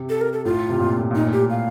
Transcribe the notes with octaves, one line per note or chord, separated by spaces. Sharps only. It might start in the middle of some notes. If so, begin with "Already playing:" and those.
Already playing: C3
A4
A#4
A4
A2 F4
C3
A#2
A2
A#2 D#4
A2
G4
F5